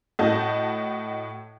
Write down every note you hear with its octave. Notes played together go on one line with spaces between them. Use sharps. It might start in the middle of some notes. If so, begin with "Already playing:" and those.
A2 F#4 D#5 A5 G6